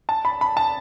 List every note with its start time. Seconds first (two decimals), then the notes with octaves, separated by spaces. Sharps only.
0.09 A5
0.25 B5
0.41 B5
0.57 A5